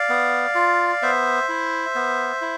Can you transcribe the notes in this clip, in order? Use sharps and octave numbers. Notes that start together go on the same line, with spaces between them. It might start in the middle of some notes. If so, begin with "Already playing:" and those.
Already playing: D5 F5
B3
F4
B3 C5 E5
E4
B3
E4